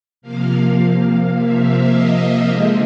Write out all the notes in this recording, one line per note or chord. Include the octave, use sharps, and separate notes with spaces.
C3 F3 A#3 F5
E5
D#5
D3 F3 G#3 C4